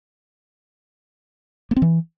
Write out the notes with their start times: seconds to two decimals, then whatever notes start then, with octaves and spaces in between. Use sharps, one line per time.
1.71 A#3
1.76 C4
1.82 E3